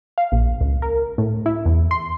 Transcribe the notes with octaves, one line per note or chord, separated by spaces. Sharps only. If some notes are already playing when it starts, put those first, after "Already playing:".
F5
A#1
C#2
A#4
A2
E4
E2
C6